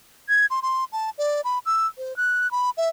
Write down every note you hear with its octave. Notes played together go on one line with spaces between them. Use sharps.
G#6
C6
C6
A5
D5
B5
E6
C5
F#6
B5
E5